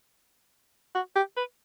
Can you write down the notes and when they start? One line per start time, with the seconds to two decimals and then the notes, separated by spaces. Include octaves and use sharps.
0.95 F#4
1.16 G4
1.37 B4